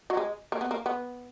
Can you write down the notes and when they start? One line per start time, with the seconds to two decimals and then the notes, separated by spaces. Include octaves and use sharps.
0.10 F#3
0.17 G#3
0.52 A#3
0.61 B3
0.71 A#3
0.86 B3